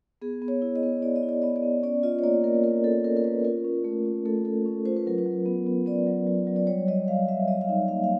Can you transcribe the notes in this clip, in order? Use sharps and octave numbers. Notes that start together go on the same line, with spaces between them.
B3 G#4
B3
C#5
E4
D#5
B3
E4 D5
D#5
E4
D5
B3 D#5
D5
B3
C#4 D5
F4 D#5
C#5
A#3 D5
A#3 A#4
A#3 A#4
C#4 A4
C#4 A#4
A#4
C#4 B4
F4 A#4
C#4
A3
C#4
A3 A4
C#4 A4
C#4
F4 C5
B4
F#3 A#4
B4
F#3
B3
B3
B3 D5
F#3
F#3
F#3
D5
G3 C#5
G3 D#5
G3 F5
G3 E5
G3 D#5
F5
D#4 E5
A#3 F5
F5